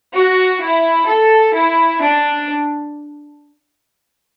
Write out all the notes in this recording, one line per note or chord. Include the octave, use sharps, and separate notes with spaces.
F#4
E4
A4
E4
D4